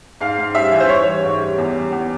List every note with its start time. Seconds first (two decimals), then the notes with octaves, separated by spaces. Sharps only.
0.21 G#2 F5
0.38 G#2
0.55 G3 E5
0.72 E3
0.80 C5
0.89 E3 C#5
1.06 G3
1.24 G#2
1.41 G3
1.58 E2
1.74 G3
1.92 E2